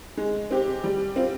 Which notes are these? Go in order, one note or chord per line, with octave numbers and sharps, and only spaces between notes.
G#3
C4 G4
G3
C4 F4